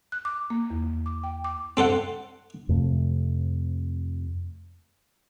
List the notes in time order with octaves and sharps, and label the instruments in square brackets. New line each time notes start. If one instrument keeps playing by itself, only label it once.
[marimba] F#6
D6
A#3
E2
D6
G5
D6
[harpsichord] C4 A4 C5 F#5
[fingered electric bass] F2 C3 A3